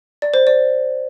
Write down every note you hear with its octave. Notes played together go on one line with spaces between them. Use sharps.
D5
C5
D5